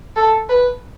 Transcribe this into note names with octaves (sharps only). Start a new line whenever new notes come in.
A4
B4